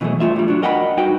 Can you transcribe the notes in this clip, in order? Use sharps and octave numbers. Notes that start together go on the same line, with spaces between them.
B2 E3 F#3 G#3 A3
G2 A3 F4 E5
G2 G3
F#3 D4
A#4 D#5 F#5 G5 A5 B5
G2 D#4 F#4 B4 G5